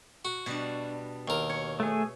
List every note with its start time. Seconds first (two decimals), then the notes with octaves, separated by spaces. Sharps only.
0.25 F#4
0.46 B2 G3 D4
1.28 D#2 A#4
1.49 C#5
1.80 A3 G#4